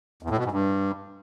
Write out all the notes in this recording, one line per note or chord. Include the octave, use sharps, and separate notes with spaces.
E2
A2
B2
G#2
G2